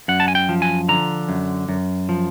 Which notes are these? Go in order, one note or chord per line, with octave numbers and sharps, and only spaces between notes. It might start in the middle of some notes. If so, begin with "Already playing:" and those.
F#2 F#5
A5
G#5
G5
F3
G#5
D3 A#5
F#2
F#2
F3